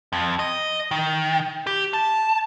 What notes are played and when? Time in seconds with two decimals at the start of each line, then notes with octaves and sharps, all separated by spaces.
0.13 F2
0.39 D#5
0.91 D#3
1.67 G4
1.93 A5